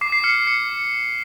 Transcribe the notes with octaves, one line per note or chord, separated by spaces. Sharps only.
D6 C7
C7
F6 C#7
D6 C#7